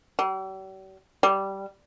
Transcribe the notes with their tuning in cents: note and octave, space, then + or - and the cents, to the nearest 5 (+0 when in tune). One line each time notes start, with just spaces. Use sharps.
G3 -45
G3 -10